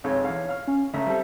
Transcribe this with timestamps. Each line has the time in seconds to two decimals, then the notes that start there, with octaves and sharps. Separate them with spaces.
0.04 B1 F2 G#3 C#5
0.25 E2 F5
0.49 F5 F6
0.67 C#4
0.94 C#2 A3 E5 A#5
1.07 G3 C4 A4